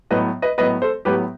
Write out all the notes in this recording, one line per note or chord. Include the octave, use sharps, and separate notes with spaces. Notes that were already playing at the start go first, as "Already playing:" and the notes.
A2 F#3 B3 B4 D#5
B4 D#5
A2 F#3 B3 B4 D#5
A4 C5
A2 F#3 B3 G4 B4